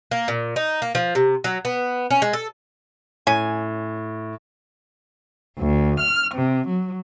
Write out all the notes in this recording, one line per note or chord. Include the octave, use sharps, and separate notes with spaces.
A#3
A#2
D#4
A#3
F3
C3
F#3
B3
C#4
G#3
A4
A2 C#4 G#5
D2
F6
C3
F#3